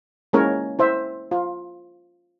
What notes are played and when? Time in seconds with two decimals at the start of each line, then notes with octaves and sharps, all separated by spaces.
0.33 G#3 A#3 C#4 E4 A#4 C#5
0.79 E4 C5 E5
1.31 F4